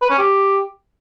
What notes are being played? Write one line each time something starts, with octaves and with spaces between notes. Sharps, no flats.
B4
C#4
G4